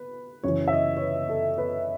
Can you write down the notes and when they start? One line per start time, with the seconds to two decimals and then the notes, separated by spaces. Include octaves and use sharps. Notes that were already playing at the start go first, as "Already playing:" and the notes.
Already playing: B4
0.44 F#2 C#3 E3 C#5
0.68 E5
0.73 D#5
0.97 C#5
1.01 B4
1.29 A4
1.58 B4